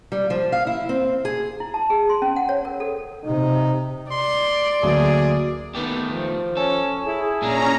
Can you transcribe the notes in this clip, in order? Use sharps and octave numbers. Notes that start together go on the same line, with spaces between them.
G3
F3
F5
E4
C4
G#4
E4
A5
G#4
C6
C#4
F#5
C#5
A#4
A4
C3 D#4
D5 C6
D2 F#3 A#3 G#4
D#3 A3 B3 G4
F3
C#4 A4
E4 G#4
A#2 A#3 C#4 D4 A#5